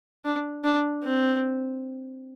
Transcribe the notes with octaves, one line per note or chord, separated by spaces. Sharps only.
D4
D4
C4